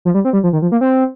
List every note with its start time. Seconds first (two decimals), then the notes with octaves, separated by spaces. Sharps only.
0.05 F3
0.14 G3
0.25 C4
0.33 G3
0.44 F3
0.53 D#3
0.62 F3
0.72 A#3
0.81 C4